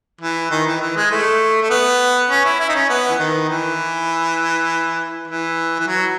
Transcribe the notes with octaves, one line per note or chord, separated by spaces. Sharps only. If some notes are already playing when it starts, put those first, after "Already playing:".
E3
D#3
E3
E3
G#3
A3
A3
B3
C#4
E4
E4
D#4
C#4
B3
E3
D#3
E3
E3
E3
F#3